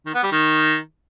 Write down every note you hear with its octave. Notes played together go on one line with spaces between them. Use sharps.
D#3
B3
G3
D#3